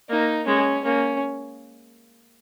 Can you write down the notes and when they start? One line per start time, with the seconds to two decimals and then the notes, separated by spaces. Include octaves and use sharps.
0.09 A#3 D#4
0.47 G#3 C#4
0.85 A#3 C#4